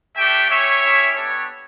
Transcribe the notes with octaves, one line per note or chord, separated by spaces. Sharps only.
A3 D4 G4 E5 G5
C#4 G4 C#5 E5
C#4 E4 G4
B3 D4 G4 A4 C#5